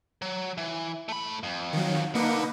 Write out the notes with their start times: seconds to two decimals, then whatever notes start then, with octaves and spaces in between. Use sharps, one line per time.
0.22 F#3
0.58 E3
1.08 A3 B5
1.43 F2
1.73 D#3 F#3
2.15 D3 A#3 D#4 B4